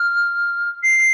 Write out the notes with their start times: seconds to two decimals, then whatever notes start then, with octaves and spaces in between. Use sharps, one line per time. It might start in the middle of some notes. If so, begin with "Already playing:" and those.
Already playing: F6
0.83 C7